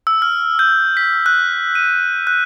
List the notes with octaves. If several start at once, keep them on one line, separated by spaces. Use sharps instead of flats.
E6
F6
G6
B6
F#6
D#7
F#6